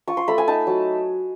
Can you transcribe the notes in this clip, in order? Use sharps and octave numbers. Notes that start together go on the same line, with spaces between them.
F4 C#6
C6
A3 B5
G#5
D#4 A5
F#3